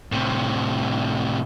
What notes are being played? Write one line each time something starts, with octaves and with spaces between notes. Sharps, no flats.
A2 C3